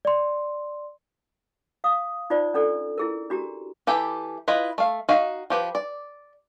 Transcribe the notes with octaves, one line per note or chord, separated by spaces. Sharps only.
D5 C6
F5 D#6
D#4 F4 C5 D5
C#4 D4 A4 D5
E4 G#4 A#4
D4 F#4 G4 A#5
E3 G4 A4 G5 B5
E4 F4 B4 D#5
A3 F5
D#4 F#4 F5
F3 G4 B4
D5